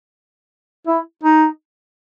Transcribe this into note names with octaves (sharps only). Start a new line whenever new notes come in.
E4
D#4